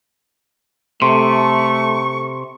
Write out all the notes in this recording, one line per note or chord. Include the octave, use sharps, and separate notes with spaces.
C3 A3 C6 C#6